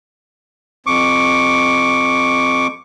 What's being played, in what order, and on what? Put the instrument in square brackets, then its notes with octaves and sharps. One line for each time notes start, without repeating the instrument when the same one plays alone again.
[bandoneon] F2 C#6 D6